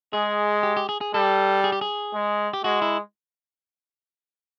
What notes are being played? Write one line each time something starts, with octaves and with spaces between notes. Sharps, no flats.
G#3 G#4
G4
G4
G#4
G#4
G3 A4
G#4
G4
G#4
G#3
G4
G#3 F#4
E4